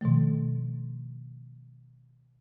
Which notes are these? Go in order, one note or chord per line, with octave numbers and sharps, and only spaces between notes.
B2 D#3 F3 A3